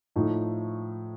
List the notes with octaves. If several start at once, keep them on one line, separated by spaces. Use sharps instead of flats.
A2 F3 A3 D#4